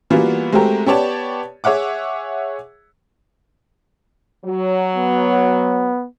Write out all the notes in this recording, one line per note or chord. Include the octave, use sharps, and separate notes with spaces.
E3 G3 A#3 B3 F4 F#4
G#3 A3 C4 F#4 G4 A#4
B3 G4 C#5 D5 A5
G#4 C#5 E5 F#5 D6
F#3
B3